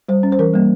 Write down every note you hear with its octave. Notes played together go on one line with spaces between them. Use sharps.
G3 C5
C#4
C5
E3 A#4
G3 A#3